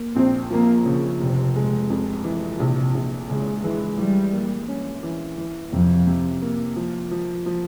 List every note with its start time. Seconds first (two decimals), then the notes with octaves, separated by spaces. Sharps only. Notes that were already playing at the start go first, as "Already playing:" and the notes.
Already playing: A#3
0.15 A#1 C4
0.50 F3 A#3
0.85 C#3 F3
1.20 F1 C3
1.55 G#3
1.90 F2
2.24 E3
2.59 A#1 C3
2.94 A#1
3.29 C#3 G#3
3.64 E3 G#3
3.98 E3 G3
4.33 A#3
4.68 C#4
5.03 E3
5.37 E3
5.72 F2 C3
6.07 C3
6.42 A#3
6.76 F3
7.11 F3
7.46 F3